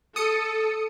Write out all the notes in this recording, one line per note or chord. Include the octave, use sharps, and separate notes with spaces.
A4 D#6 C#7